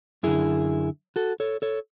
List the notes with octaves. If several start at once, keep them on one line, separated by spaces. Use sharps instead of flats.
F#2 D3 E4 G#4
F#4 A4
A4 C#5
A4 C#5